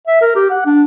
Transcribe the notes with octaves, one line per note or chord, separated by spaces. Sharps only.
E5
A#4
G4
F#5
D4